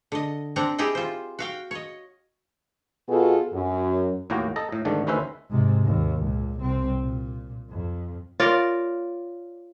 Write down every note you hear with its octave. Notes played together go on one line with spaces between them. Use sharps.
D3 D#5
C4 D4 F#5 A#5
E4 G4 G#4 D#5
F4 C5
F#4 F5 G5
C#5 D#5
B2 B3 F4 F#4 G#4 A4
F#2
D#2 A2 A#3 F#4 G5 A#5
A4 D#5 A#5
A2
G#2 D3 D#3 A3 D4
D2 D#3 C#4 B4 C5 E5
G#2 C3
D#2
C#2 A#2
C2 C4
A#2
F2
F4 A#4 C#5 D5